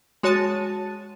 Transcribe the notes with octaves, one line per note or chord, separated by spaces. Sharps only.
G#3 F#4 C#5 A5 A6 D#7